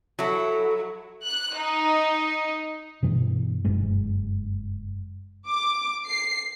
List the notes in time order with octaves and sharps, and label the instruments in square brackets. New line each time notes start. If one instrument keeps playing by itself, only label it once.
[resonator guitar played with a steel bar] F#3 [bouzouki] E4 A4
[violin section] F#6
D#4
[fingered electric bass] G2 B2 E3 D4
F#1 G2 G#3
[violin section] D6
C7